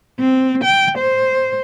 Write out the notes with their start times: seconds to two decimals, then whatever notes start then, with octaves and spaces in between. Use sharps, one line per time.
0.19 C4
0.64 G5
0.98 C5